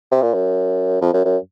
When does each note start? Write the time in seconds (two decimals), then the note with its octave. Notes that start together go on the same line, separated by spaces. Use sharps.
0.11 C3
0.22 A#2
0.34 F#2
1.01 F2
1.14 F#2
1.25 F#2